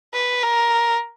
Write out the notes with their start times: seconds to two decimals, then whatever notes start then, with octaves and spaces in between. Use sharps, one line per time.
0.14 B4
0.43 A#4